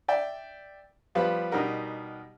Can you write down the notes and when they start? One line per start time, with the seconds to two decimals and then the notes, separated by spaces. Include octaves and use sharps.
0.08 D5 E5 G5
1.15 F3 G3 B3 F4 B4
1.52 B2 G3 D#4 A#4 F#5